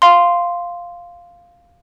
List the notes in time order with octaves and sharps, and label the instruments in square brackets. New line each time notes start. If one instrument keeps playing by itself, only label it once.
[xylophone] F5 C6